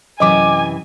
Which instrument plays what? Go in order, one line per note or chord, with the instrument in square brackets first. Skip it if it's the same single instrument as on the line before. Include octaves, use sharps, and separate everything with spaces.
[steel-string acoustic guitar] F#2 C3 E3 [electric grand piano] D#5 D6 [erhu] G#5